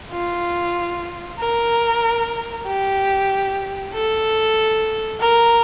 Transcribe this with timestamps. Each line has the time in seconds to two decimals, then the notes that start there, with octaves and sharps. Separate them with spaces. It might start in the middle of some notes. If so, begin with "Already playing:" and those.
0.12 F4
1.39 A#4
2.67 G4
3.94 A4
5.21 A#4